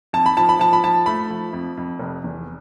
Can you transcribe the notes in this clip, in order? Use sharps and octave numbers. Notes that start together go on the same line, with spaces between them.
F2 A5
B5
F3 A5
B5
F3 A5
B5
F3 A5
A3 B5
F3
F2
F2
F1
E2